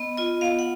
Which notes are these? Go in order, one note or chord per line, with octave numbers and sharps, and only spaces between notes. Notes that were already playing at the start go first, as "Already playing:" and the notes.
Already playing: B3 D#5
F4 D#5
B3 F5
F#5